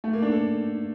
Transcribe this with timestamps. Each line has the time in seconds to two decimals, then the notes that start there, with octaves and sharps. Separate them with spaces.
0.04 A3
0.13 A#3
0.22 D4
0.32 A4